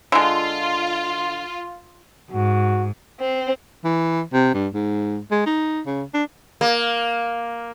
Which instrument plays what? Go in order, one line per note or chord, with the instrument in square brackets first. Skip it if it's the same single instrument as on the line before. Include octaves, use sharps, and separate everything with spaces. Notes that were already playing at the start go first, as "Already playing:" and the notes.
[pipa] D3 G#3 [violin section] F4
[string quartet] G#2 [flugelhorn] F#4
[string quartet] C4
[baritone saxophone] E3
C3
G2
G#2
G#3
D#4
C#3
D4
[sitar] A#3